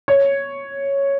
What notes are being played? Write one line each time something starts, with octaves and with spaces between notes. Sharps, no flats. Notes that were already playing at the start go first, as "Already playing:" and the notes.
C#5